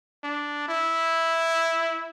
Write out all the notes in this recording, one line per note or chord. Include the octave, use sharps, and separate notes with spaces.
D4
E4